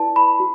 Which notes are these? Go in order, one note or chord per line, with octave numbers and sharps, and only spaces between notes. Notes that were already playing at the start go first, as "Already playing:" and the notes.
Already playing: E4 B4 D5 A5
B5
F#4